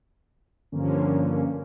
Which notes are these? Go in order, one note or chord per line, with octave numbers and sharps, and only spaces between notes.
G2 D3 F3 A#3 C#4